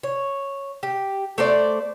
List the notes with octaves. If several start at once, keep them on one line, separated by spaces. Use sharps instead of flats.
C#5
G4
A3 C5 D5